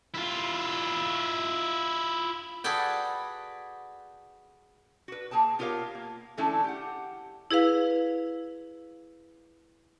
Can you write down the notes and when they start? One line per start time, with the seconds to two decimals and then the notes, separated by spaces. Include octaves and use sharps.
0.15 E4 F4
2.64 F#4 G#4 A4 B4 D5 G5
5.08 F#4 B4
5.31 A#3 G#4 G5 A5
5.59 B3 F4 G4 A#4 C#5 F5
5.95 A#3
6.37 D3 E3 A3 C#4 E4 A4
6.64 G4 F#5
7.51 E4 G#4 B4 F5